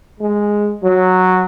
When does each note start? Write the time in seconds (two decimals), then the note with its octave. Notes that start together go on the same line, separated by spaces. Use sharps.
0.20 G#3
0.82 F#3